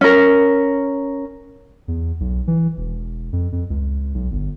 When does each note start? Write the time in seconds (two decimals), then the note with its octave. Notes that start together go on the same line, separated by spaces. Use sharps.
0.01 C#4 A#4
1.88 E2
2.20 B1
2.47 E3
2.77 E1
3.33 F2
3.52 F2
3.70 C#2
4.14 B1
4.31 G1